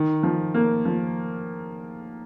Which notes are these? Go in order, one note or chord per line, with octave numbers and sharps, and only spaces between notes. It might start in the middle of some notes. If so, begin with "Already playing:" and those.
Already playing: D#3
F3
A#3
F3